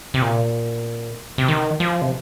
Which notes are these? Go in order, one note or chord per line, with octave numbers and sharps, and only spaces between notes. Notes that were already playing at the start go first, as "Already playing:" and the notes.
C3
A#2
C3
D#3
F3
C3